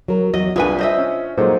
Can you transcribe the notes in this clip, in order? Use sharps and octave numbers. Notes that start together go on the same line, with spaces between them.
F#3 A#4
E2 F#3 D#5
C2 D4 F4 G#4 B4 G#5
C5 D#5 E5
C#4
A#2 F#3 G#3 D#4 A4 C5